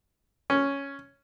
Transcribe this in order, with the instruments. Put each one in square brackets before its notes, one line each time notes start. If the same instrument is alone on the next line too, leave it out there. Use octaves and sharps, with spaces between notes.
[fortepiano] C#4